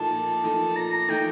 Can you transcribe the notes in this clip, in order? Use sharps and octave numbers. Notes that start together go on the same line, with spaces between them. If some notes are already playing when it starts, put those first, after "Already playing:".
Already playing: A#2 F3 A3 D#4 A5
A#2
F3 A3 D#4
A#2 A#5
A#5
F3 A3 D#4 G5